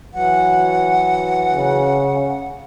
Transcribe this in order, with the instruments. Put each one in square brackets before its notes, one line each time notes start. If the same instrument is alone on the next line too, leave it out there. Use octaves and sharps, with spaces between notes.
[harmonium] E3 F#3 [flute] F#5
[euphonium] C#3